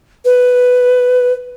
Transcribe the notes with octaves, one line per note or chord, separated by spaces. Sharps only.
B4